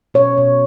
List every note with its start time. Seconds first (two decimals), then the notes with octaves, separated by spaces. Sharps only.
0.14 B2 C#5
0.38 B2